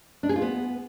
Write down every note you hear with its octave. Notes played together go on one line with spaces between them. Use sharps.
D4
G#4
F4
B3